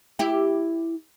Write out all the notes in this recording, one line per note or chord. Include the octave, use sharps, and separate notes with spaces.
E4 G4